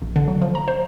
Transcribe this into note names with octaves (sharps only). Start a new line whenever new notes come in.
A#1
D3
F#3
F3
A#5
C5